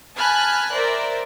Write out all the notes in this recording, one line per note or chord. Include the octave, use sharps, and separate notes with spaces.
G#5 A5 B5 F6 F#6
A#4 C5 D5 E5